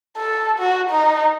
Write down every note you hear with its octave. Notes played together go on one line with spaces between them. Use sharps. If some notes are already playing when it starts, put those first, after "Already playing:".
A4
F#4
D#4